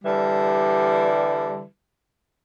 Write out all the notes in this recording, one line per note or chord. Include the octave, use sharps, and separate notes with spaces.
D3 E3 G3